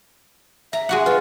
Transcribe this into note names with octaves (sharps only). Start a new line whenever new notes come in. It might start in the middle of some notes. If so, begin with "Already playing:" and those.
E5 A#5
G#3 F#4 F#5
F4 B4